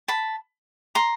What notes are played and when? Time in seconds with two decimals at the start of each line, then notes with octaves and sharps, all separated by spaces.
0.08 A5 B5
0.95 A#5 C6